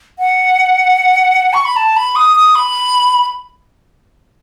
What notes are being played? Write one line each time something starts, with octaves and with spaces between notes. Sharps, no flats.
F#5
C#6
B5
A5
B5
D#6
D#6
B5